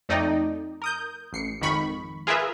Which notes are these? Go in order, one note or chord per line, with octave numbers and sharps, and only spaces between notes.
F2 A3 D#4 D5 D#5 G5
A#4 D#6 G6
A1 C7 C#7
G#1 F2 G#2 D#3 B5 C#6
F4 G#4 A#4 B4 E5